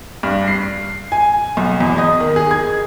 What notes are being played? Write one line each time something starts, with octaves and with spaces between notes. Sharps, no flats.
G2
C7
G#5
B1
E2
D#5
D#3
G#4
G#6